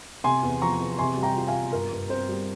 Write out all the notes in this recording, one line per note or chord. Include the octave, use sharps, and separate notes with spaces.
C3 G#5 C6
E2
F3 A#5 C#6
E2
C3 G#5 C6
G3
G5 A#5
F4
F5 G#5
F4
G2 A#4
G2
C4 C5
G3